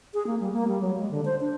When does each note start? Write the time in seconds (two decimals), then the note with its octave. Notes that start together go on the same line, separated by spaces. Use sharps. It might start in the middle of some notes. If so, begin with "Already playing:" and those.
0.14 G#4
0.27 A#3
0.40 G3
0.53 A#3
0.68 G3
0.81 F#3
0.98 G#3
1.11 D3
1.25 C5
1.40 D4